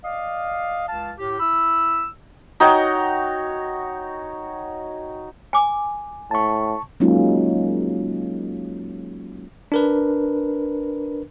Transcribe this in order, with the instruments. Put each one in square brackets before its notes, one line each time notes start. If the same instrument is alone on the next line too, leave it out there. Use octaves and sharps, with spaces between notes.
[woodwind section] D5 D#5 F5
C#2 F5 A5
A2 G4
E4 B5 E6
[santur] D#4 F#4 C#5 G5
[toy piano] G#5 D6
[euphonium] A2 [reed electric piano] A5 C#6
[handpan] F#3 G#3 A#3 C#4 D#4 F4
[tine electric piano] D4 A#4 B4